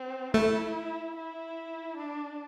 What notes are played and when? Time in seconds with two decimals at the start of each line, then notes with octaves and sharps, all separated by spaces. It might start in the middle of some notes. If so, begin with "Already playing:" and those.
Already playing: C4
0.34 A3 E4
1.16 E4
1.97 D4